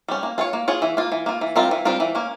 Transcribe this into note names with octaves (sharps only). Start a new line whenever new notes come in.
G3 C#4
A#3
F4 G#4 C#5
A#3
F4 G#4 C#5
E3
A#3 F4
E3
A#3 F4
E3
G3 C4 F4 A#4
E3
G3 C4 F4 A#4
E3
A#3 C#4